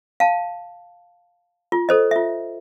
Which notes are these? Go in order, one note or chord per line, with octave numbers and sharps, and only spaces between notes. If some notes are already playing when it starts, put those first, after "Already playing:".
F5 A5
F4
A4 C5 D#5
F4 E5